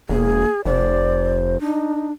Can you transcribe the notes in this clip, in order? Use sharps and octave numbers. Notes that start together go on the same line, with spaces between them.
E1 A#3 G#4
F1 C5 D5
D4 D#4